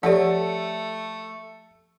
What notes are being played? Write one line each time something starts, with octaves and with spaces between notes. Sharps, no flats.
F3 A3 G4 A4 C#5 D5 F#5